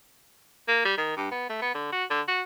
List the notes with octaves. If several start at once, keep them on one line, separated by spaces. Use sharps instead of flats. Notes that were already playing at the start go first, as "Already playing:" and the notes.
A#3
G3
D#3
G2
B3
A3
B3
D3
F#4
D3
F#4